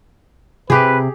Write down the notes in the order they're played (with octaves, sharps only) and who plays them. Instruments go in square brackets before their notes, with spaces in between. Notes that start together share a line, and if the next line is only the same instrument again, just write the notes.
[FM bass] C3 [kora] G4 G#4 [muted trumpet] B4